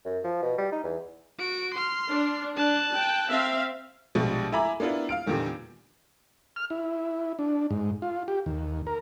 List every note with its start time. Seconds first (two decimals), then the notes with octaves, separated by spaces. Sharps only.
0.05 F#2
0.24 F3
0.42 B2
0.58 G3
0.72 D#4
0.84 E2
1.39 F#4 D7
1.74 C6 F6
2.10 D4
2.57 D4 A5 F#6
2.95 G5
3.29 C4 E5 F5
4.15 A#1 B2 F3 G3 G#3
4.52 E4 E5 G#5 A#5 B5 D6
4.80 A#3 B3 D4 E4 F4
5.09 F5 F6 D7
5.26 E2 A#2 D3 D#3 G3
6.56 F6
6.70 E4
7.39 D4
7.70 G#2
8.02 F4
8.28 G4
8.46 D#2
8.87 A#4